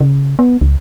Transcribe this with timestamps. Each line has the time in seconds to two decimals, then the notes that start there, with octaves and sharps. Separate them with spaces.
0.01 C#3
0.39 B3
0.61 C#2